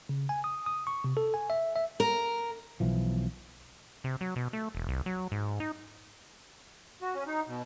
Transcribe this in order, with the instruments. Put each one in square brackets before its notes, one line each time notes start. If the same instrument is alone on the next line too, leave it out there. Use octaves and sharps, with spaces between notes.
[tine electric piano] C#3
G#5
D#6
D#6
C#6
C3
A4
G#5
E5
E5
[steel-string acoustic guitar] A#4
[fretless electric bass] B1 E3 F3
[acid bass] C3
F#3
B2
A3
E1
C2
F#3
G#2
D#4
[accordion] F#4
C#4
D#4
B2